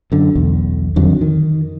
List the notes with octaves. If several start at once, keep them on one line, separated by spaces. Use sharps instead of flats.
F#2 D3
B1 E2
F2 D3 D#3 F#3
D#3